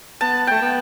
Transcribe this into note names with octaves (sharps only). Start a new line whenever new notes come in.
B3 A5
A3 G5
B3